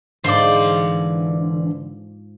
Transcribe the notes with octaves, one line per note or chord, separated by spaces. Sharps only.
G#2 D3 E3 F3 C5 D5 C6